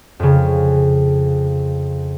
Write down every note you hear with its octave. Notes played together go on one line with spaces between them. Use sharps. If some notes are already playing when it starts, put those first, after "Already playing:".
F2 C#3